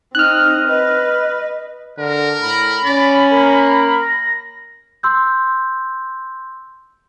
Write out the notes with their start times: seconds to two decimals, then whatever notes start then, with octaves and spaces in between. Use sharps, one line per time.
0.15 C4 D#4 D#5 F6 F#6
0.68 B4 D#5
1.98 D3 A#4
2.42 A2 B5
2.84 C#4 D5
3.33 A#3 A#4
4.01 A#6
5.03 C6 E6 G6